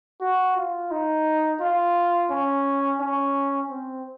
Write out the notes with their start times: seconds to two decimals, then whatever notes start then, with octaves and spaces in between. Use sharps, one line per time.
0.21 F#4
0.57 F4
0.91 D#4
1.61 F4
2.31 C#4
3.00 C#4
3.70 C4